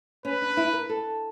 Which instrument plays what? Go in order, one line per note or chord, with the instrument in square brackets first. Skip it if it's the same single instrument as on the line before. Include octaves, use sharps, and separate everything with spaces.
[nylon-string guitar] C#4 [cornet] B4
[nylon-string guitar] D4
E4
A#4
A4